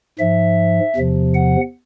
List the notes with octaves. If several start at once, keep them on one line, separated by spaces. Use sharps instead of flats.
G#2 F3 E5
E2 C3 F3
F#5